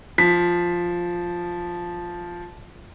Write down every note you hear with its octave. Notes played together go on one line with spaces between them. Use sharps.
F3 B6